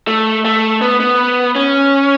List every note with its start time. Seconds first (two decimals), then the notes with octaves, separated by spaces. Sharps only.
0.08 A3
0.45 A3
0.81 B3
1.00 B3
1.56 C#4